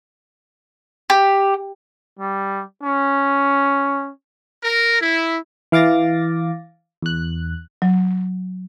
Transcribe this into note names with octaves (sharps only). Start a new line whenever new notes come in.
G4
G3
C#4
A#4
E4
E3 F5 D6 A6 A#6
E2 F#6
F#3